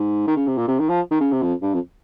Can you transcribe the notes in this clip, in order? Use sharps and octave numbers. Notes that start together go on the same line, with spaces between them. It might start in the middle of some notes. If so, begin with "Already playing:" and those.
Already playing: G#2
D#3
C#3
C3
A#2
C3
D#3
F3
D#3
C#3
C3
F2
G2
F2